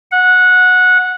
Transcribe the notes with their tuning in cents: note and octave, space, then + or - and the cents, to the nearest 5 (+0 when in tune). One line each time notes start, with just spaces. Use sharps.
F#5 -15